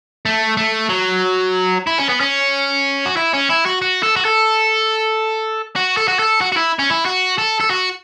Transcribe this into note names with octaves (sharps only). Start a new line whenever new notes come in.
A3
A3
F#3
E4
C#4
B3
C#4
F#4
E4
C#4
E4
F#4
F#4
A4
F#4
A4
F#4
A4
F#4
A4
F#4
F#4
E4
C#4
E4
F#4
A4
A4
F#4